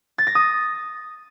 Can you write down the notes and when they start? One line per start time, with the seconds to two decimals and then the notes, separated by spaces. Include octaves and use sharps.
0.18 A6
0.27 A#6
0.35 D#6